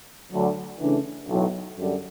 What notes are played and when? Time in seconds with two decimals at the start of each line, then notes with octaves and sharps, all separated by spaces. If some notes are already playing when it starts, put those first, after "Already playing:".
0.32 D2 D3 F#3
0.80 C#3 E3 A3 D4
1.28 B1 A2 F#3
1.77 F#2 D3 G3